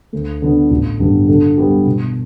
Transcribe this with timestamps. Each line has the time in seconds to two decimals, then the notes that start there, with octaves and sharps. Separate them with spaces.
0.13 D2
0.42 D3 B3 D4
0.71 A1
1.00 G2 D3 G3 B3
1.29 D3
1.57 G3 B3 G4
1.86 B2